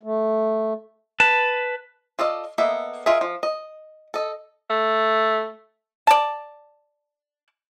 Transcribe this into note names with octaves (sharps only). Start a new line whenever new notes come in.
A3
B4 A5
F4 A4 D5 D#5
A#3 B3 A4 D#5 E5
F4 G#4 A#4 D#5 E5
F3
D#5
A4 D#5
A3
D5 A5